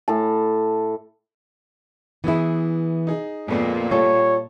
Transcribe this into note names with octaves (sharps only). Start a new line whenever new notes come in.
A2 A5
E3 B3 E4 G#4
D#4 G#4
F2 A#2 G#3 B3 C4
G3 F4 A4 C#5